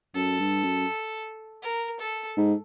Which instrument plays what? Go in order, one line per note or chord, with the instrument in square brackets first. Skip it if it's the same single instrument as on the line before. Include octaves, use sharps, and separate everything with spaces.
[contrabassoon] F#2 [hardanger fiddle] A4
[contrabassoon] G2
F#2
[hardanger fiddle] A#4
A4
[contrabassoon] G#2